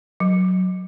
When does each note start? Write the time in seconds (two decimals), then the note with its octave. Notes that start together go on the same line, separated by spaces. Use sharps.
0.20 F#3